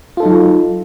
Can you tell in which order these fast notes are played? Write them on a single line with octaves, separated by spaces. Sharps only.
F4 A4 D#4 F#3